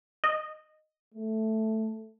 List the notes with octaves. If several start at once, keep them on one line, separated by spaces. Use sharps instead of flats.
D#5
A3